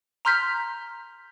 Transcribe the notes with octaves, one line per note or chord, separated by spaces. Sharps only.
A#5 C6 F6 G6 B6